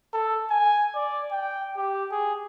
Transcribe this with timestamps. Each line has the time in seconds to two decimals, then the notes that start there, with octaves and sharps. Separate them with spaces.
0.13 A4
0.50 G#5
0.95 D5
1.31 G5
1.77 G4
2.11 G#4